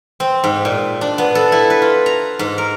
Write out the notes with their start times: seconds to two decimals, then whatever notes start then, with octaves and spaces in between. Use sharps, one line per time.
0.20 C4
0.44 G#2
0.65 A#2
1.01 D4
1.18 B3
1.35 A4
1.52 E4
1.70 B4
1.82 F4
2.06 A#5
2.39 G#2
2.58 A#4